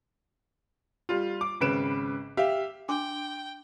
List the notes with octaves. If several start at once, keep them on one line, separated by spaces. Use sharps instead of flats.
G3 F4
D6
G#1 C#3 B4 D7 E7
G4 E5 F5
D4 G5 C6 D6